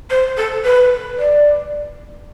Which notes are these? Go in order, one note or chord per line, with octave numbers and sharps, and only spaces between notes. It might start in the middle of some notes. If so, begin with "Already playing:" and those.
C5
A4
B4
D5